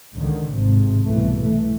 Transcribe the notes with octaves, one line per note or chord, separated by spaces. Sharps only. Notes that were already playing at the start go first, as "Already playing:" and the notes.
C#2 D3 D#3
G#1 G#2 C3
C2 B2 E3 A3
E3 A3